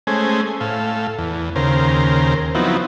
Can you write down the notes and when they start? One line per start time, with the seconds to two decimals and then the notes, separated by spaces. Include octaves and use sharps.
0.07 G#3 A3 C#4 C5 G#5
0.61 A2 A4 F5
1.18 E2
1.56 D#2 C#3 A#4 C5
2.55 F3 F#3 B3 C4 D#4 E4